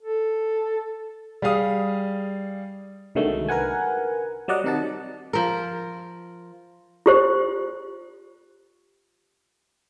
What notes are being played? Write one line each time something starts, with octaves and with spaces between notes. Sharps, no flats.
A4
G3 G#4 F5 D#6
C2 D3 D#3 F#3 G#3 A3
A#4 B4 F#5 G#5
F#3 G3 D5 D#5 F#5
C3 D#3 D#4 F#5 A5
F3 A#4
F4 G4 C5